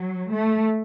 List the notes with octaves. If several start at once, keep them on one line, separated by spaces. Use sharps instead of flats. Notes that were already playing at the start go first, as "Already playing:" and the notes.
Already playing: F#3
A3